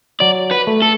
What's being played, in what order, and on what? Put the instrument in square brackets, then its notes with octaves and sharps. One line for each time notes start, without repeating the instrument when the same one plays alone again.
[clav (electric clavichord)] F#3 [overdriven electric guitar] D5
[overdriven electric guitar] B4
[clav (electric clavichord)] A3
[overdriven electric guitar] A4